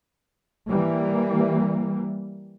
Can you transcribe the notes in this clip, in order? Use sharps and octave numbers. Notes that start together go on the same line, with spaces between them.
E3 G3 A#3